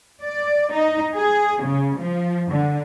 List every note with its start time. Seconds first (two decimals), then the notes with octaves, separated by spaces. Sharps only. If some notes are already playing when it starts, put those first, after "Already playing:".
0.23 D5
0.73 D#4
1.14 G#4
1.62 C#3
1.98 F3
2.51 D3